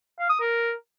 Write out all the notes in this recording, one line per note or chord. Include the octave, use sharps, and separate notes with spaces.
F5
D#6
A#4